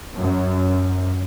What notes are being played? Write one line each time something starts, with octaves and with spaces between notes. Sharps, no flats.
F#2